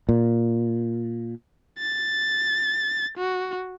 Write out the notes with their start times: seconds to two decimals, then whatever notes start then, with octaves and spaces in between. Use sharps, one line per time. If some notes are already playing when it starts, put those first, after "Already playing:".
0.09 A#2
1.78 A6
3.18 F#4